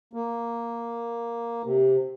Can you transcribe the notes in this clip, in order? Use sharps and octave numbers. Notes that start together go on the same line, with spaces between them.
A#3
C3